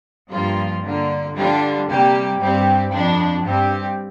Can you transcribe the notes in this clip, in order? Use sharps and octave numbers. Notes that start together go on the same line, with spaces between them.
G2 F3 A#3 F4
D3 A#3 F4
D3 G3 D4 F4
C3 G3 A#3 G4
G2 G3 C4 G4
F2 F3 D4
G2 G3 C4 G4